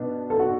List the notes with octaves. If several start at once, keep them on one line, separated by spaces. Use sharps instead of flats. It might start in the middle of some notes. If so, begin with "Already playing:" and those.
Already playing: B2 B3 D4
A4
F#4